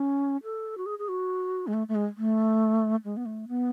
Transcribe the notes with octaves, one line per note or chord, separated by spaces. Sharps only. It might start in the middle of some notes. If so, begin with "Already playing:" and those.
Already playing: C#4
A4
F#4
G#4
G#4
F#4
G#3
A3
A3
G#3
A3
G#3
B3
A3
B3